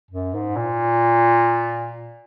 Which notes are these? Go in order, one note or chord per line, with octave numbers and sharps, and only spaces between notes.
F#2
G#2
A#2